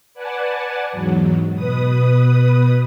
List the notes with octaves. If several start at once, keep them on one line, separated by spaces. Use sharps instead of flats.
B4 D5 F#5 G#5 A5
E2 G#2 F#3
B2 B4 D#6